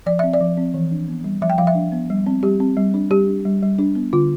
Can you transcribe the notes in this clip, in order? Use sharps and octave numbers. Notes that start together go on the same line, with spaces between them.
F3 D5
C4 E5
D5
F3
C4
E3
D4
B3
G3
F3 E5
G5
F3 F5
E5
D4
B3
G3
C4
G3 G4
C4
G3
D4
G3 G4
D4
G3
G3
D4
B3
D3 F4